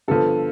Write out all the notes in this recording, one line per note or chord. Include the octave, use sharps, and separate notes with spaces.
G2 D3 F3 B3 A4